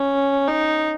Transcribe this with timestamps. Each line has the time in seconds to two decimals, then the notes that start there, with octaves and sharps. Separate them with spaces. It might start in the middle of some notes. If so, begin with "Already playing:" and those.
Already playing: C#4
0.48 D#4